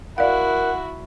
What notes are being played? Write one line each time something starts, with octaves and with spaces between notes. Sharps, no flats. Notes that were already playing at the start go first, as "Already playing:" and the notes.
E4 F#4 A#4 D5 F5 F#5